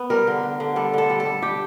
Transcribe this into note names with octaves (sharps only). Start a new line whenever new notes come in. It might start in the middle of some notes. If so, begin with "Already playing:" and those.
Already playing: B3
G3 A#4
D3
D3
D3
G3 A4
D3 A4
G3
A4
G3
G3 G4